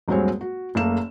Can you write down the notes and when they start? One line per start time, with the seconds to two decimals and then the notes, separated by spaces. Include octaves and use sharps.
0.08 D#1 G2 F#3 G#3 C4 C#5
0.41 F#4
0.75 F#1 A3 A#3 E7